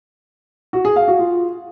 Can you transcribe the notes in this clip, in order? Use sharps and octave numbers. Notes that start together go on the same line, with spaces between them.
F#4
G#4
F5
F#4
F4